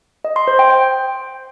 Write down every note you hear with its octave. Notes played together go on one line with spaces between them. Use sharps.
D#5
C6
C5
G5
G5